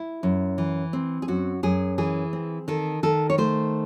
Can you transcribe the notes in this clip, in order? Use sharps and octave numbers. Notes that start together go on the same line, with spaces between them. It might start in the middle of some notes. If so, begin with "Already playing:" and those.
Already playing: E4
F#2
E3
C4
G#4
F#2 F#4
F#2 G#4
E3 G#4
C4
D#3 A4
D#3 A4
C#5
A3 C5